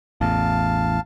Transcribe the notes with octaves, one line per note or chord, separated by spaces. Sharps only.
A1 E2 F5 A5